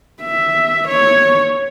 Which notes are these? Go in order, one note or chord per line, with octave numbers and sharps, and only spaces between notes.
E5
C#5